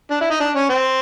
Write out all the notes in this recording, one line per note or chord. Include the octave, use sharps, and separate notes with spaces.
D4
E4
D#4
D4
C#4
C4